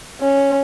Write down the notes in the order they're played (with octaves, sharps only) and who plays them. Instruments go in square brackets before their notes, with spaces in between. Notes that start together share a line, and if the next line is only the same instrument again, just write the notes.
[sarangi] C#4